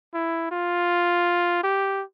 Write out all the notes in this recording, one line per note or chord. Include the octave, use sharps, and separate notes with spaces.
E4
F4
G4